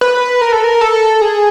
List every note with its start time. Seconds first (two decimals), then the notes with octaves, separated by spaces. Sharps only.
0.01 B4
0.41 A#4
0.52 A4
0.64 A#4
0.81 A4
1.21 G#4